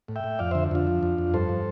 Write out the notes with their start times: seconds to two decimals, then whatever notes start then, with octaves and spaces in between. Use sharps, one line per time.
0.08 A2
0.16 E5 G5
0.24 A2
0.39 F2 D5 F5
0.51 D3 C5 E5
0.71 F2 D4 F4
0.87 F3
1.03 F2
1.18 F2
1.34 G2 A4 C5
1.49 F3